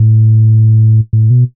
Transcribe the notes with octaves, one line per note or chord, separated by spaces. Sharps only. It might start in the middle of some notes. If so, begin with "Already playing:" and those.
Already playing: A2
A2
B2